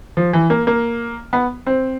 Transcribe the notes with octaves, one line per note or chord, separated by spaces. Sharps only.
F3
E3
A#3
A#3
B3
C4